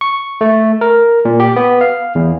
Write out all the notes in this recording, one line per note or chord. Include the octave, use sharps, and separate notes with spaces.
C#6
A3
A#4
A#2
G4
B3
F5
E2